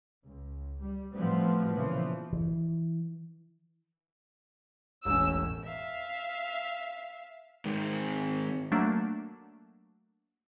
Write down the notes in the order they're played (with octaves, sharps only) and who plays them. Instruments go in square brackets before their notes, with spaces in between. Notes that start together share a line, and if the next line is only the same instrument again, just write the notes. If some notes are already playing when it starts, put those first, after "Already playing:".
[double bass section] C#2
G3
A2 F3 G3 A3 B3 C4
A#2 C#3 E3 F3
[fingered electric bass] E3
[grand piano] E1 A1 C#4 [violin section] E6
[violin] E5 F5
[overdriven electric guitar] G#2 D#3
[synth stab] F#3 A3 A#3 D4